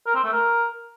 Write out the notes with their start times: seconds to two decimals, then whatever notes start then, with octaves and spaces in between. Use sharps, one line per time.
0.06 A#4
0.15 C4
0.24 A3
0.33 A#4